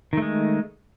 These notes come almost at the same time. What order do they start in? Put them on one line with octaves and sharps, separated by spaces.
D#3 A3 G#3